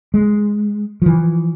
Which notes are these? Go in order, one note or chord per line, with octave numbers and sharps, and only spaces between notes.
G#3
E3 F3